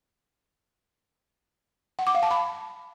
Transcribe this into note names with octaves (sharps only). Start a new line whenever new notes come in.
F#5
D6
F5
A5
B5